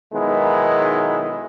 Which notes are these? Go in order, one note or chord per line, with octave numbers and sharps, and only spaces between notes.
B1 D#3 G#3 B3 D#4 E4